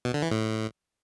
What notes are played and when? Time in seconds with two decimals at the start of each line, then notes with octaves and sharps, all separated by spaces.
0.05 B2
0.14 D3
0.22 E3
0.31 A2